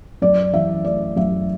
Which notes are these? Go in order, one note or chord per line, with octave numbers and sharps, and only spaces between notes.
F#2 D5
E3 E5
A3 D5
F#2 E5